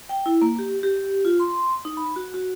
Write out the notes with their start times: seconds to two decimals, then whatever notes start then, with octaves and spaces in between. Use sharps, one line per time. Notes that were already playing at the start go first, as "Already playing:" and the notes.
0.09 G5
0.26 E4
0.42 A#3
0.59 G4
0.83 G4
1.25 F4
1.40 C6
1.85 D#4
1.97 B5
2.16 F#4
2.34 F#4